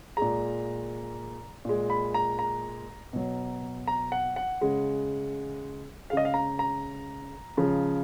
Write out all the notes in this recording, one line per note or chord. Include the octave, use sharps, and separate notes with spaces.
A#2 G#3 A#5
A#2 G#3
B5
A#5
A#5
B2 F#3
A#5
F#5
F#5
C#3 G#3
C#3 G#3 D#5 F5
F5
A#5
A#5
C#3 F3 G#3